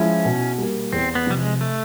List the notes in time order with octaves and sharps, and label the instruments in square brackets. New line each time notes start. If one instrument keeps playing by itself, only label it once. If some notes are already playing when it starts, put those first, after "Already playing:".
Already playing: [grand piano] F3 G#3 E4 [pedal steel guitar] C#4
[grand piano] B2
G3 A#3
[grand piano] E2 [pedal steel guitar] C4
[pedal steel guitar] B3
[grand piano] C3 F3 [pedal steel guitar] G3
[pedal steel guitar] G#3
A3